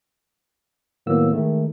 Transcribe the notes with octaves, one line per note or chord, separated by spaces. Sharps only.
A2 D#3 F#3 A#3 B3 E6
D#3 G#3 A3